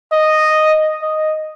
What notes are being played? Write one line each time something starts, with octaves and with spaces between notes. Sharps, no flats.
D#5
D#5